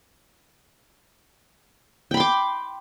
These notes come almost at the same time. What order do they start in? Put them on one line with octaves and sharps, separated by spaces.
G5 B5 C6 D6